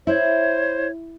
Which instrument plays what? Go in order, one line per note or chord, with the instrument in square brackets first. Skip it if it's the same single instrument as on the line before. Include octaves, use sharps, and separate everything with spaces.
[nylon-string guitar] E4 [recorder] C5 [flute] C#5